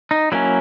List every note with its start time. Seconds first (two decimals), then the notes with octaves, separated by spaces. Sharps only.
0.11 D#4
0.32 F#3 A#3 C#4 E4